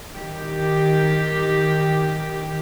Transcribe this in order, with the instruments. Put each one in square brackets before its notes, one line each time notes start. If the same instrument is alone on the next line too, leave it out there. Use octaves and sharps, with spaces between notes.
[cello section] D#3 G4